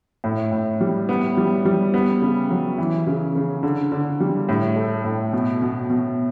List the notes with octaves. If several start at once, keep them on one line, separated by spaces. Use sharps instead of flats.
A2
A2
G3
B3
G3
G3
B3
C#3
F#3
E3
C#3
C#3
D3
D3
G3
A2
A3
A2
B2
B2
B2